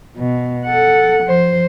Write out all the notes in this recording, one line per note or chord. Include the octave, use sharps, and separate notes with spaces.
B2
A4 F#5
F3 C5